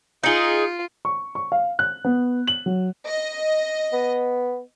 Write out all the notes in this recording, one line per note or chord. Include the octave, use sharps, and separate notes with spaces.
D#4 F4 G#4 G6 C#7 G7
C#6
C#6
F5
F#6
B3
F#7
F#3
D#5
B3